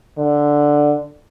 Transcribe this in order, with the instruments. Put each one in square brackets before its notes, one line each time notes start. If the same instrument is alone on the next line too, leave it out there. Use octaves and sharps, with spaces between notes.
[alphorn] D3